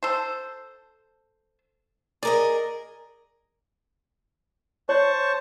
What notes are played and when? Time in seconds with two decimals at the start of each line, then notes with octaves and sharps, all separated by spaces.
0.03 A4 C5
2.23 G#4 A#4 D5 D#5
4.89 C5 C#5 A5 C#6